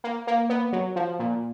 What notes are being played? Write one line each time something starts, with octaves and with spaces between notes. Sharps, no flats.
A#3
A#3
B3
F#3
F3
A#2